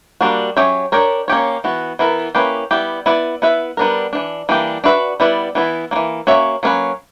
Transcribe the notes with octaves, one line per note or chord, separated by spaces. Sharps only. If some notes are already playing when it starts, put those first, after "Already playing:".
G3 A#3 D4 F#4
F#3 C#4 G4 C#5 E5
D4 G4 A#4 C#5
A#3 C#4 G4 C#5
E3 B3 F#4
E3 B3 E4 A#4
A#3 C#4 E4 G4 B4
G3 B3 E4 G4
B3 E4 B4 D5
B3 E4 B4 E5
G3 B3 D4 A#4
E3 A#3 D4
E3 G3 A#3 D4 G4
D4 F#4 B4 E5
G3 B3 E4 B4 D5
E3 B3 E4
E3 G3 A#3
A#3 C#4 F#4 C#5 E5
F#3 A#3 C#4 E4 B4